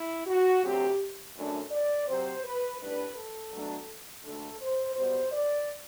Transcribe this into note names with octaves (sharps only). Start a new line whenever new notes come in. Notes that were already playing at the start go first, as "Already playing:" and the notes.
Already playing: E4
F#4
D2 C3 F#3 C4 G4
F#2 D3 A3 D4
D5
C3 F#3 C4 C5
B4
A2 G3 D4 B4
A4
B2 F#3 A3 D4
D2 D3 A3 D4 A4
C5
B2 G3 B3 C5
D5